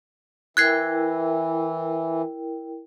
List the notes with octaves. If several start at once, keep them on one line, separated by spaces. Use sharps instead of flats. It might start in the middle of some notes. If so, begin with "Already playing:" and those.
E3 E4 A#4 G5 F#6 G#6 C7